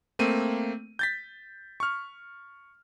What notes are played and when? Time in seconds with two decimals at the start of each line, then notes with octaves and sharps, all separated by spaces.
0.19 A3 A#3 C4 D#7
0.99 G6 A6 B6
1.80 C#6 F6